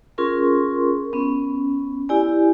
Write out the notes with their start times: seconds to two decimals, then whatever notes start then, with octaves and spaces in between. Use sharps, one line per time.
0.18 C#4 F4 G#4 A#4 C6 C#6
1.13 B3 C#4
2.09 E4 G4 D5 G#5